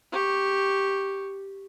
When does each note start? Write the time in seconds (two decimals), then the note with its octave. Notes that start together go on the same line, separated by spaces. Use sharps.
0.12 G4 C#6